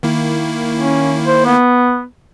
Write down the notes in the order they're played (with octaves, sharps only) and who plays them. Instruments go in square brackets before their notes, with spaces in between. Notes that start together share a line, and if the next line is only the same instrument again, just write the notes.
[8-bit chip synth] D#3 A#3 E4
[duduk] C#4
C5
B3